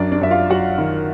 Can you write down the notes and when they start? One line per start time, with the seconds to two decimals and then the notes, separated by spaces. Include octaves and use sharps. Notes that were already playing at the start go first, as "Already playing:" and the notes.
Already playing: F#2 D4 D5
0.12 D4 D5
0.21 F#2 E5
0.31 F4 F5
0.50 F#3 F#4 F#5
0.78 D#3